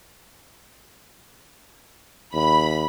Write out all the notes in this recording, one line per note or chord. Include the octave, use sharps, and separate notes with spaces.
D#2 B5